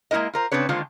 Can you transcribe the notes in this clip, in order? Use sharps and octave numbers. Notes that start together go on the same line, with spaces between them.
G#3 A#3 C4 E4 A#4 D#5
F4 A#4 C5
C#3 F#3 C4 D4 B4 C#5
D3 D#3 G#3 A#3 F4 C5